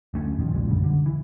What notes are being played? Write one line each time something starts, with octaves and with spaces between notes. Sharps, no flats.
D2 A3 C#4
E2 A#2 D#3 F3
B1 A#2 C#3 G#3
B1 F#2 D3 G3
D3
E3